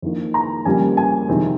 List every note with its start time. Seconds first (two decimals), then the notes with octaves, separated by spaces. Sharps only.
0.02 F2 D#3 A#3 D#4
0.34 A#5
0.65 F2 C#3 G3 A#3 C#4 G#5
0.97 G#5
1.28 F2 C3 D#3 G#3 C4